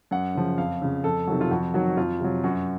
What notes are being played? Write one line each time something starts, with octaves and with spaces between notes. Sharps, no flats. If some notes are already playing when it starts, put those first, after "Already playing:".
F#2 F#5
C#3 F3
F2 F5
C#3 F3
F2 A4
C3 D#3 F#3
F4
F2 F#4
D#3 F#3 F#4
F2 F4
C3 F#3
F#2 F#4